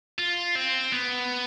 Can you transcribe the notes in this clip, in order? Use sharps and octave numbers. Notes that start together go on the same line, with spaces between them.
F4
C4
B3